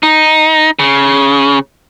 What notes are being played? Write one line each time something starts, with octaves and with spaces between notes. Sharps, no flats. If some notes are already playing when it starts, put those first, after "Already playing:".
D#4
C#3